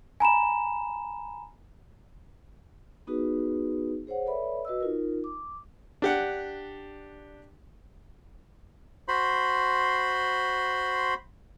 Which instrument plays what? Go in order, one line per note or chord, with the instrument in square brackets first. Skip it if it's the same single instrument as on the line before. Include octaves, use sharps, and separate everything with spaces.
[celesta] G#5 A#5 B5 E7
[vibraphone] B3 D#4 F#4 G#4 B4
G#4 C5 C#5 F#5
A4 B4 C#5 D5 E5 B5
F#4 B4 D#5 E6
D#4 F4 A#4
D6
[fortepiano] D4 G4 F#5
[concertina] F#4 C5 B5 C6